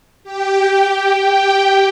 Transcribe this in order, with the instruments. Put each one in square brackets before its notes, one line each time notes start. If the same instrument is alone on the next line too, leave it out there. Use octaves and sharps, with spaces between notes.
[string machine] G4 G5